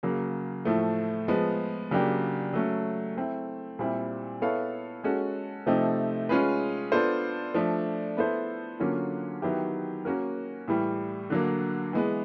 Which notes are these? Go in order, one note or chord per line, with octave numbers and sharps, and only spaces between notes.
C#3 F#3 A#3
A2 F3 A3
F3 G#3 B3
C#3 F#3 A#3 D4 G4
F#3 A3 C#4
A3 C4 E4
A#2 G3 C4 E4
B3 E4 A4 C#5 F5
G#3 C#4 F#4 A4
C3 F3 A3 C4 D#4
G#3 C#4 F4 G#4 B4
B3 D4 F4 A4 C5
F3 A3 D4
B3 E4 A4 C5
D3 F#3 A#3 C#4 F4
D#3 F#3 B3 E4 G4
A#3 C#4 F#4 A#4
A2 E3 G3
D3 F#3 A#3
E3 G#3 B3